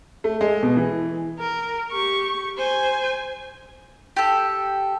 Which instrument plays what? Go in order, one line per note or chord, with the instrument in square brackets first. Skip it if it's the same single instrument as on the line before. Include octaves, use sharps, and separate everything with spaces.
[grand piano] A3
G#3
B2
E3
[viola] A#4
G4 C#6
C5 G#5
[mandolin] G4 A4